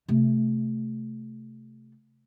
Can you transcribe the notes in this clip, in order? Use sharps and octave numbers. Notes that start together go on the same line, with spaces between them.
C3 A3